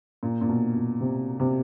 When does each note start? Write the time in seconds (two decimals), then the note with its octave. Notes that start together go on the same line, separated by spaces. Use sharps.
0.23 A#2
0.41 A#2
0.49 B2
0.75 B2
1.01 C3
1.40 C3